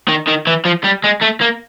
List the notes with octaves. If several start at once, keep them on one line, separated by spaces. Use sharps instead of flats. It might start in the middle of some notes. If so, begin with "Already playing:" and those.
D#3
D#3
E3
F3
G3
G#3
A3
A#3